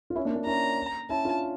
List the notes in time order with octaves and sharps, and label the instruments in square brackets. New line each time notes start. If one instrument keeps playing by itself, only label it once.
[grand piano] F4
C#4 E4
A#3 D4
A#3 D4
[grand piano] C#4 E4 [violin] A#5
[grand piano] C#4 E4 [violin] A5
[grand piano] D4 F4